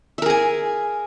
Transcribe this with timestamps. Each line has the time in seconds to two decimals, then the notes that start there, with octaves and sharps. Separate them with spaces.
0.18 E5
0.22 A#4
0.26 G#4
0.30 G#5